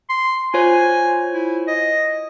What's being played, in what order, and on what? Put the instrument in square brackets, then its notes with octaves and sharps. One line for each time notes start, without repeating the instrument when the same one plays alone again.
[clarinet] C6
[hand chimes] F4 C5 C#5 [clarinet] G#5
[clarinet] E4
D#5